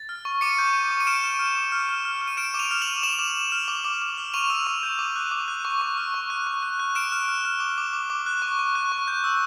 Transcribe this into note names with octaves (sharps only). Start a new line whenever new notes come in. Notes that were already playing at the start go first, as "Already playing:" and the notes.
Already playing: A6
F6
C#6
D6 C#7 D#7
G6
G6
D6
D#7
F6 D7 E7
F6
F6
D6
F6
F6
F6
F6
D#7
F6 D7 E7
D6
D#7 F7
F6
E7 F#7
F6
D6 E7 F#7
D6
D6
F6
D6
D6
D6
F6
C#6 D#7 F7
E6
C#6
G6
D6
F#6
D6
F#6
C#6
C#6
F6
C#6
F#6
C#6
F#6
F#6
F6 D7 E7
F6
F6
F6
D6
D6
D6
D6
F#6
C#6
C#6
F#6
C#6
G6
E6